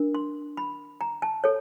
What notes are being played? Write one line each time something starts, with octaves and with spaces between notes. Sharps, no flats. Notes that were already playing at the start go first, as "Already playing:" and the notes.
Already playing: D4 A#4
C6
B5
A#5
A5
A4 C#5